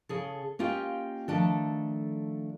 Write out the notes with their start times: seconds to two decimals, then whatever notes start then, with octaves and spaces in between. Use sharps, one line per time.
0.09 C#3 G#4 A4
0.59 A#3 C#4 F4 G4 D#5 G5
1.28 D#3 F3 A3 D4 A4